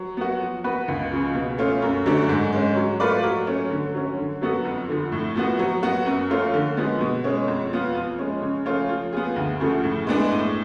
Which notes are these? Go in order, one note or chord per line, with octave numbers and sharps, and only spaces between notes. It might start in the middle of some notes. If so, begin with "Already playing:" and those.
Already playing: F#3
B3 F#4
F3
B3 F#4 B4
C#2
C#3 F3
B2
A3 C#4 F4
F#2
D3 F#3 A3 D4
G#2
G#3 C#4
F#3
A3 F4 B4 D5
F#3
A3 C#4
D3
F#3 C#4
D3
F#3 B3 F#4 A4
F2
D3 F3
A2
F3 B3 F#4
F#3
B3 F#4
F#2
F3 A3 C#4 F4
D3
F3 G#3 B3
B2
G#3 C#4
F2
F3 B3 F4
F3
G#3 C#4
C#3
F3 A3 C#4 F4
F3
B3 F4 G#4
D2
C#3 F3 A3
A2
G#3 B3 D4 G#4
A2